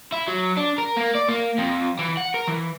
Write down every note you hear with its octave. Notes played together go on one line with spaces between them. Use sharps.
E4
F#3
D4
A#4
A#3
D5
A#3
F2
E3
F#5
A#4
E3